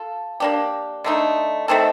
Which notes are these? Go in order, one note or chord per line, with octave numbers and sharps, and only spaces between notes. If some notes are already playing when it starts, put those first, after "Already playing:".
Already playing: F4 A4
A#3 D4 G4
D3 A3 D#4
A3 C4 D#4 A4